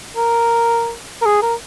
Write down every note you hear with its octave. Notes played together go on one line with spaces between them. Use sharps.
A#4
A#4
G#4
A#4